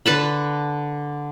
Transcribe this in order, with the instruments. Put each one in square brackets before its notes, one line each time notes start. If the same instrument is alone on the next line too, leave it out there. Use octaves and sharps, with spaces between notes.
[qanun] D3 B4 A5 B5